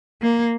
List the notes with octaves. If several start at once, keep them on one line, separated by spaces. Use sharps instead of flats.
A#3